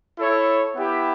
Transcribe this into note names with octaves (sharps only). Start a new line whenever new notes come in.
E4 A4 C#5
B3 E4 G4